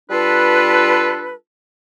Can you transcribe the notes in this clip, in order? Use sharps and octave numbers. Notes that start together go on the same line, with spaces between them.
G3 D4 F4 A4 B4